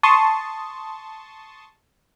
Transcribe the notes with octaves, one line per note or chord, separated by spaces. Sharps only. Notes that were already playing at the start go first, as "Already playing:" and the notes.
A5 C6 C#6 D#6